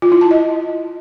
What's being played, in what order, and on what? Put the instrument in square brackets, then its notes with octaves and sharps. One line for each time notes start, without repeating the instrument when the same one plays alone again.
[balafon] F4
E4
A5
D#5